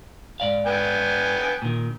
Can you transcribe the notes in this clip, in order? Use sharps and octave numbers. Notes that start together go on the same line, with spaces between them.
G#2 D5 F5
B3 G5 G#5
A#2 D#3